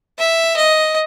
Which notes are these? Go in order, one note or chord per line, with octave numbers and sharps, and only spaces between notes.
E5
D#5